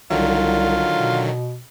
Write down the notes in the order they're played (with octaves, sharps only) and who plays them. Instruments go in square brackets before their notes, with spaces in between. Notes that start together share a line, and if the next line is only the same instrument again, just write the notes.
[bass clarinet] C2 [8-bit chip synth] D3 D#3 F#3 [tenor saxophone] F4
[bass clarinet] B2